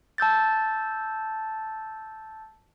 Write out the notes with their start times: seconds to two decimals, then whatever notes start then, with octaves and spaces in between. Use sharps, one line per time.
0.18 A5 E6 G6 A6